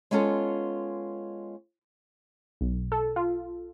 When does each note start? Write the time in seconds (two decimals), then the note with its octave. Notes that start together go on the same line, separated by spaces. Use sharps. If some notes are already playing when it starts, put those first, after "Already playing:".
0.11 G#3 B3 C#4 F4 A4
2.61 B1
2.92 A4
3.16 F4